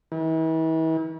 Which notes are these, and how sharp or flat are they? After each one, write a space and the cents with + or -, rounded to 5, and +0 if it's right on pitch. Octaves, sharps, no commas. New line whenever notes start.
E3 -40